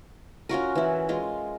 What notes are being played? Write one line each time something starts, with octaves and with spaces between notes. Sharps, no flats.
C#4 F4 F#4 A#4
E3 E4
G#3 F4